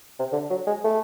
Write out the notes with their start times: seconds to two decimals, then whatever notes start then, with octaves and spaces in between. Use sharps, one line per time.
0.19 C3
0.33 D3
0.50 F#3
0.67 G#3
0.84 A3